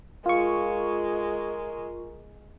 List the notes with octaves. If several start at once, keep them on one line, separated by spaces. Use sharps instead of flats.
G#3 F4 A#4 C#6